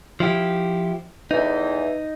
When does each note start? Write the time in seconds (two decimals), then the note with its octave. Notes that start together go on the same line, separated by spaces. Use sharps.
0.20 F3 E4 G4
1.31 E2 A2 E3 D#4